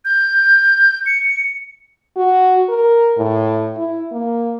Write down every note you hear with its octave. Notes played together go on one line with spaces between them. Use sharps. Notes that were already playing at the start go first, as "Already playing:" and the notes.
G6
C#7
F#4
A#4
A2
E4
A#3